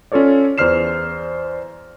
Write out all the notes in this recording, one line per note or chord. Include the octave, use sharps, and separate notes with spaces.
C#4 F4 A4 C#5 D5
E2 C5 D5 F6 C7 E7